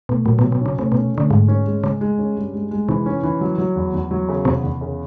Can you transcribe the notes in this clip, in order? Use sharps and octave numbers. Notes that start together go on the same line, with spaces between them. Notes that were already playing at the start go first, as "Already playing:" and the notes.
B2 A3
A#2 F#3
B2
F#3
B2
C#3 C#4
C3 A3
B2
C#4
D3 A3
G#2 G#3
C#4
G#3
C#3 G#3
G#3
C#4
G2
G#3
G#3
C3 E3
C#4
E3
F#3
F#3
E2
E2
F#3
C#3
E2 C3
E2
C#3